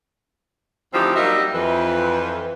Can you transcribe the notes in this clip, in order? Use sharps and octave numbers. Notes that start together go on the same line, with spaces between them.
D2 E3 F3 C4 D#4 G4
F#3 G3 A#3 D#4 F#4 E5
F2 E3 B4